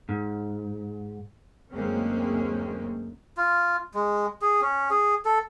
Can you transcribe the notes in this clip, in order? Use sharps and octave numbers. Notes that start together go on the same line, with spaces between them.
G#2
F#1 D2 G#3 A#3 C4 C#4
F4
G#3
G#4
C#4
G#4
A4